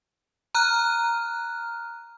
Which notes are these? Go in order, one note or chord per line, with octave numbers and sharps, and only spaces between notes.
A#5 F6 F#6